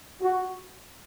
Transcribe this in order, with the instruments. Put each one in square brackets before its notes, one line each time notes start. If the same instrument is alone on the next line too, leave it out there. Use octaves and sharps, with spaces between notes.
[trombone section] F#4